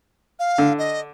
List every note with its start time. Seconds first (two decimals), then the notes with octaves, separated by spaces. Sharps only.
0.39 F5
0.58 D3
0.78 D#5